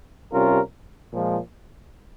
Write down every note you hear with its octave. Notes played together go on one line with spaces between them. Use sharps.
C3 G3 C#4 F4 A#4
A#2 F3 G#3